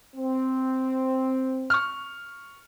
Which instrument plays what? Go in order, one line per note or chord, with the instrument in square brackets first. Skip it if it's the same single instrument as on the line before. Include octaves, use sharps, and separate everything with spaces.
[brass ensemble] C4
[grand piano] C#6 F6